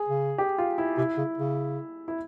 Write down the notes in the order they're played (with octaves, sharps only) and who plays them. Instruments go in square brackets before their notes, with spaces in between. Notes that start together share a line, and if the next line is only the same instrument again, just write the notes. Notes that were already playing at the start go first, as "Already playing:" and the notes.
Already playing: [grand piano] G#4
[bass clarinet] C#3
[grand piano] G4
F4
E4
[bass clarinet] C3 [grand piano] E4
[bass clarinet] C#3
C#3
[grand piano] E4